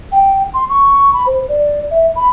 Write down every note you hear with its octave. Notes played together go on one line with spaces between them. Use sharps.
G5
C6
C#6
B5
C5
D5
E5
B5